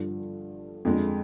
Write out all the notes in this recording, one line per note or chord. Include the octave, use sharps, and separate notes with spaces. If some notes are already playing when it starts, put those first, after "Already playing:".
Already playing: G2 D3 F3
F2 D3 G#3